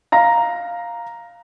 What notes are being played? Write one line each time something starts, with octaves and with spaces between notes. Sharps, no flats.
F5 A#5 A#6